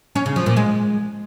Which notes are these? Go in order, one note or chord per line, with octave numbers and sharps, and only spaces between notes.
C#4
C#3
F3
A#2
G#3